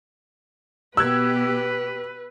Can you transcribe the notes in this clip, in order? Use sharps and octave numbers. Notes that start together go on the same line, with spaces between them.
B2 B3 G4 B4 E6 F#6 G#6